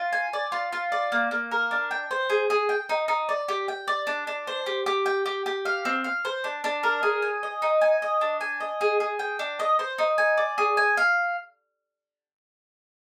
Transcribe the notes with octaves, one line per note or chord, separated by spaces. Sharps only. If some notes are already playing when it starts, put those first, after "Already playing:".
Already playing: F4
G#5
D5
F4
F4
D5
A#3
A#3
A#4
D4
G5
C5
G#4
G#4
G5
D#4
D#4
D5
G4
G5
D5
D4
D4
C5
G4
G4
G5
G4
G4
F5
C4
F5
C5
D4
D4
A#4
G#4
G#5
D#5
D#4
G#5
D#5
D4
G#5
D#5
G#4
G#4
G5
D4
D#5
C5
D#4
G#5
D5
G#4
G#5
F5